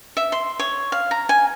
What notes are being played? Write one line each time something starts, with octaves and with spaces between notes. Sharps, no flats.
E5
C6
C#5
F5
A#5
G#5